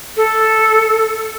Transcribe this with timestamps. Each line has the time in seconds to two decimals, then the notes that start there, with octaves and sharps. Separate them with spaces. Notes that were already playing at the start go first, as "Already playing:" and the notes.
0.17 A4